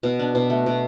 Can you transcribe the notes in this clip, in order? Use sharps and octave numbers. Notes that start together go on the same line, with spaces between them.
B2
D4
B2
A3
B2